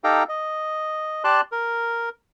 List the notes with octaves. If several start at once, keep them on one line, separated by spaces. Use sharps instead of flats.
D#4 G4 A4 F5 G5 A#5
D#5
G4 D5 A5 C6 F#6
A#4